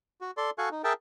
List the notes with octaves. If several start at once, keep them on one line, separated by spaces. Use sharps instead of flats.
F#4
A4 D5 C6
F#4 A4 F5 G#5 C#6 F#6
D#4
G#4 A#4 E5 G5 A5